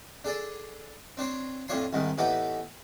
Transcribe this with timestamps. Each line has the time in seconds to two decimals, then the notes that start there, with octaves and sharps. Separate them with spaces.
0.25 D4 G#4 A4 D5
1.17 C4 D4 C5 C#5
1.68 F2 A2 D4 C#5 G#5 C6
1.93 C2 G#2 D#3 G#3
2.18 A2 E3 B3 D#4 G4